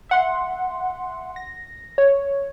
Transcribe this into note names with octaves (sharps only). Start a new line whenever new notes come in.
E5 F#5 C6
A#6
C#5